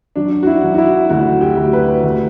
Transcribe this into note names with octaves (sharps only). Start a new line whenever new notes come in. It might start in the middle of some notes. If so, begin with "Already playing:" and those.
F#3 D4
F#4
E4
F#3
F#4
E4
D2 F#4
G4
D2
B4
D2